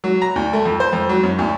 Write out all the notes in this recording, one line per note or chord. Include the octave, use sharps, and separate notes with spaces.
F#3
A#5
D2
A3
F2
C5
F2
F#3
F#2
D2